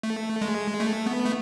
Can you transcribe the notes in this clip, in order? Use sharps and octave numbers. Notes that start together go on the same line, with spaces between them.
A3
G#3
A3
B3
A3